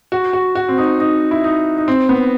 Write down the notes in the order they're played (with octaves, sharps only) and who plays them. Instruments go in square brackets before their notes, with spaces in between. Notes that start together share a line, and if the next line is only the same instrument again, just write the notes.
[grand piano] F#4
F#4
F#4
C4
D#4
D#4
E4
D#4
D#4
C4
B3